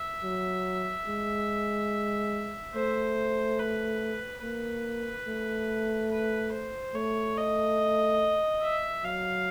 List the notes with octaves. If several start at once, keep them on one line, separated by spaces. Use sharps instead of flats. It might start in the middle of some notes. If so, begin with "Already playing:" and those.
Already playing: E5
F#3
G#3
A3 C5
B4
A#3 B4
A3
B4
C5
A3 C#5
D#5
E5
F#3 F5